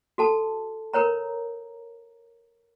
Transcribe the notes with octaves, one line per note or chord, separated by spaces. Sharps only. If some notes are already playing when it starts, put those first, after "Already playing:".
F#4 A4 A5
A#4 B4 C#5 A#5